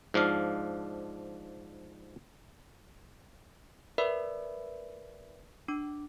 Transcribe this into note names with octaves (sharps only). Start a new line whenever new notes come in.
G#2 F3 D4 F5
A#4 B4 D5 E5 B5 E6
D4 D6